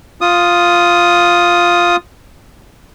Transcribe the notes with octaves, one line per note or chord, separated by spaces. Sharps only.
F4 D#6